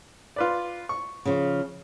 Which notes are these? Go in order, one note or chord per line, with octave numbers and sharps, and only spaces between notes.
F4 B4 D5
C#6
C#3 F3